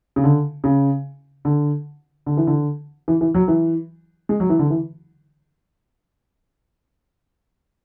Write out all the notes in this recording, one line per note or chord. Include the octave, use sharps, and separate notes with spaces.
C#3
D3
C#3
D3
D3
E3
D3
E3
E3
F#3
E3
G#3
F#3
E3
D3
E3